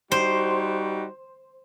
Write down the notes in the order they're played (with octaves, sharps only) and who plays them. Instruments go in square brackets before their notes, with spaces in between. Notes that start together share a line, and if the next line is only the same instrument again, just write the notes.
[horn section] G3 D#4 F#4 [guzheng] C5